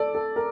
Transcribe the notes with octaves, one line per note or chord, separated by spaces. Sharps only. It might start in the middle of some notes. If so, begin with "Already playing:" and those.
Already playing: A4 D5
A4
A#4